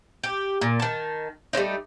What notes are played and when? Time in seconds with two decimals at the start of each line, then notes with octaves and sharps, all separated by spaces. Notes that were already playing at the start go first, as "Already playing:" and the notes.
0.23 G4
0.61 A#2
0.80 D#3 A5
1.53 G3 A3 C4 D#4